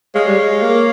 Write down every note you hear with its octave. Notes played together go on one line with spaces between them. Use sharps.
G#3 C#5 F5
G3
G#3
A#3